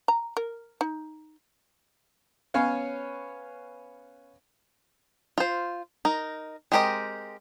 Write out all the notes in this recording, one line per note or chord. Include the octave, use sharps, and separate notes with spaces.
A#5
A#4
D#4
B3 C#4 C#5 F5 G#5
F4 C5
D#4 A#4
G#3 C4 G4 A#4 D#5